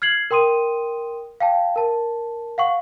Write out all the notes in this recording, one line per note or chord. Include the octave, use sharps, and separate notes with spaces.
F6 G#6 C7 F#7
A#4 G5 C6 D#6 D#7
F5 G5 A5
A#4 A5
F5 F#5 C#6